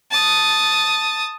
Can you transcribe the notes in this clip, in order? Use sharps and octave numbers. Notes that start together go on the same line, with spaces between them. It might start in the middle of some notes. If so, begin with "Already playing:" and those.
A5 D#6